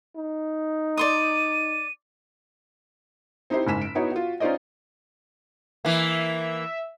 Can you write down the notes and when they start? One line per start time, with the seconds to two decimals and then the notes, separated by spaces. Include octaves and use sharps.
0.16 D#4
0.97 D5 C6 D#6 D#7
3.50 C4 D#4 E4 G4 C5
3.66 F#1 G#2 G#5 B6 E7
3.81 D7
3.95 B3 D#4 E4 F#4 C#5
4.12 F4 F#4
4.40 C#4 D#4 F4 C5 D5 D#5
5.85 E3 A#3 E5